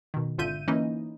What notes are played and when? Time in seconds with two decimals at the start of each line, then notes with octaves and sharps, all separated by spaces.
0.14 B2 D#3
0.38 G#1 D3 F4 E5 G6 D#7
0.68 E3 A#3 C#4 D#4 E4 D#5